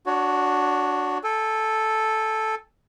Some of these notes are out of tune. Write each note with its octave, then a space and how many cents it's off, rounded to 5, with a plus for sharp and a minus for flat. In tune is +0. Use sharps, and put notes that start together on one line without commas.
D4 +0 F#4 +0 C#5 +30
A4 -5 G#5 -40